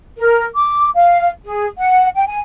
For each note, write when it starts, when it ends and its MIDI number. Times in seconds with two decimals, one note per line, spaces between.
0.17 0.44 70
0.55 0.88 86
0.94 1.28 77
1.45 1.65 68
1.78 2.08 78
2.16 2.24 79
2.27 2.38 80